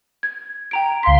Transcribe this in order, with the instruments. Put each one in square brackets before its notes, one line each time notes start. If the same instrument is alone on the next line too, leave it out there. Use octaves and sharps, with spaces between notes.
[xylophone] G#6
G5 A#5 D7
[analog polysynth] C#2 C6 [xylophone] F5 B6